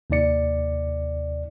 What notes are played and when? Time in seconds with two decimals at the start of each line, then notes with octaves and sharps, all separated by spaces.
0.10 D#2 C3 D#4 D5 C#7